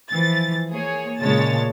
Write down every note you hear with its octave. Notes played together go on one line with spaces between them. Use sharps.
E3 F3 A6
A#3 G#4 C#5
A#2 C#3 G#3 C#5 A5 A6